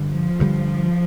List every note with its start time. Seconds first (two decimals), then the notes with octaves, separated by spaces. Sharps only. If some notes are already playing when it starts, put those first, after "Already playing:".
Already playing: G2 D3 G3
0.09 F3
0.39 G2 D3 G3